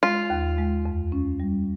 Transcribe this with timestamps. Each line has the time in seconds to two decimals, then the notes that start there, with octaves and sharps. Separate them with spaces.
0.03 G#3 F4
0.30 D#2
0.58 G#3
0.85 F2
1.12 C#4
1.40 G3